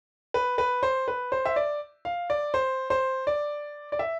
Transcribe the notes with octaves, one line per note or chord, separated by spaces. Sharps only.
B4
B4
C5
B4
C5
E5
D5
F5
D5
C5
C5
D5
D5
E5